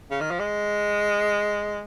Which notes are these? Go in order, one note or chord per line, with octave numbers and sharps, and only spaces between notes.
C#3
D#3
F3
G#3